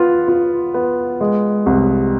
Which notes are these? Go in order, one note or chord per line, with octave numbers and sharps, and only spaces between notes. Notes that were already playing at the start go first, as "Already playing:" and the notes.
Already playing: B3 F4
F4
B3
G#3
C2